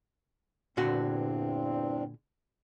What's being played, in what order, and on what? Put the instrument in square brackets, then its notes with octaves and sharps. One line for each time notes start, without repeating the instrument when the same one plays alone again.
[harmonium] E2 G2 C4 [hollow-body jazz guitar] A#2 D3 F#4